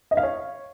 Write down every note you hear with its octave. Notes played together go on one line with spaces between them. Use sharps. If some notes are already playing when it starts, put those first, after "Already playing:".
D#5
F5
C#5